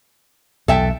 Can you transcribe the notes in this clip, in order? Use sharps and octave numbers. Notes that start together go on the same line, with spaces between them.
B1 E2 A4 E5 G5